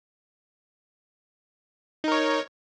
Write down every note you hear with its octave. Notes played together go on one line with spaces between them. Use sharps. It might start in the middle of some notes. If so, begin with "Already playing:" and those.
D#4 A#4 C#5